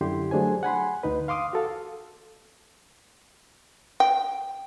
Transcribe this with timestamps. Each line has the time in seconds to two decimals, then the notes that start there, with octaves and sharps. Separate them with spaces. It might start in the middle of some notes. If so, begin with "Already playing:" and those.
0.01 F#2 D3 E4 G4 C6
0.31 F#3 A3 D4 G#4 C5 G#5
0.63 F#5 G#5 B5 C6
1.03 D2 D#4 B4
1.28 F5 C6 D6 D#6
1.53 F#4 A4 F5
4.00 G5